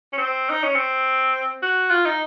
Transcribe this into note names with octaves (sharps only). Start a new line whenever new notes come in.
C#4
C4
D#4
C#4
C4
F#4
F4
D#4